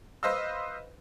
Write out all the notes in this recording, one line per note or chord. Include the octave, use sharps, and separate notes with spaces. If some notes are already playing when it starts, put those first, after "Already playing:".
B4 C5 D#5 F5 E6